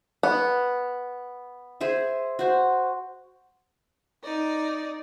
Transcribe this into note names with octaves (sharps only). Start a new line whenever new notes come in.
B3
G#4 C5 E5
F#4 C5
D#4 D5